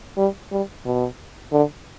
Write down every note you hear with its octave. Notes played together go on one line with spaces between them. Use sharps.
G3
G3
B2
D3